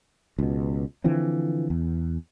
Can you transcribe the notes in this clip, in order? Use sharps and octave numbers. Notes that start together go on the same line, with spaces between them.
C#2 B2
D3 E3 F3 C4
E2